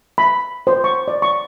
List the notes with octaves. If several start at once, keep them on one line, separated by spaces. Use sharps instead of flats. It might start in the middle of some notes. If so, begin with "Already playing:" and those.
B5
C5
C#6
D5
C#6